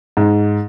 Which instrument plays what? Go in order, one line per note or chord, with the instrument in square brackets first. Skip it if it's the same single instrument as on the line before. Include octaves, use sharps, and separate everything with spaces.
[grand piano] G#2